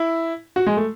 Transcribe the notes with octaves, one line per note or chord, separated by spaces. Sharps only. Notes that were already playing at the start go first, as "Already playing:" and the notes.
Already playing: E4
F#4
G#3
A3